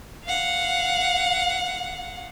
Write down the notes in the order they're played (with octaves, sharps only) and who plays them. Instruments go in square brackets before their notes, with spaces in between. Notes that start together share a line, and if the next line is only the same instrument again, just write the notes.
[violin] F5 F#5